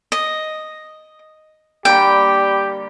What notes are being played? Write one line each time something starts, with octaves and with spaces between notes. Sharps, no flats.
D#5
D3 G3 A#3 G4 G5